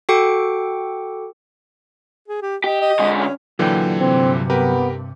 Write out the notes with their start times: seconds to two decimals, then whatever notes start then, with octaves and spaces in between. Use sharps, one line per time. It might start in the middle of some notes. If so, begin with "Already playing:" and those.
0.09 F#4 A4 G5 D6 C#7
2.28 G#4
2.42 G4
2.64 G4 D#5
2.81 D#5
2.99 D3 G#3
3.17 C#4
3.59 A#2 D3 E3 F#3 G5
4.00 G2 C3 C4
4.50 B3 G4 A#4 B4